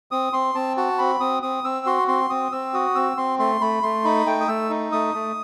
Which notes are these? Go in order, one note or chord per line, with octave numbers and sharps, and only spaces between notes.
C4 D#6
C4 C6
C4 A5
F#4 A5
C4 B5
C4 D#6
C4 D#6
C4 E6
F#4 C6
C4 C6
C4 D#6
C4 E6
F#4 D#6
C4 E6
C4 C6
A3 C6
A3 B5
A3 C6
D#4 B5
A3 G5
D#6
A3 E6
D#4
A3 D#6
A3